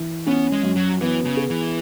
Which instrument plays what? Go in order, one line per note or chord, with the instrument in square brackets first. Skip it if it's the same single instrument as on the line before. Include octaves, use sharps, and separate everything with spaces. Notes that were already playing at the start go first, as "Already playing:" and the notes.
Already playing: [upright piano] E3
[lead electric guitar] B3 [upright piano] C#4
[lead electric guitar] G#3
[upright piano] F#2
[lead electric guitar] F#3
[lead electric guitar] E3 [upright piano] B3
[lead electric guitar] C#3
[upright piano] G#4
[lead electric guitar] E3